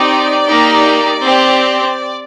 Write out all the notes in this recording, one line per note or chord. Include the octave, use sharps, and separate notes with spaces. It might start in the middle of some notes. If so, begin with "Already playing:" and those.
Already playing: C4 D#4 G4 D5
A#3 D#4 G4
C4 G4